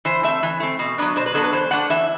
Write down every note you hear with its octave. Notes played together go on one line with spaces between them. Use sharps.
E3 C5
A3 C4 E5
E3
A3 C4
B2
F#3 B3 D4
B2 C5
B4
F#3 B3 D4 A4
B4
E3 C5
A3 D4 F#5
E3 E5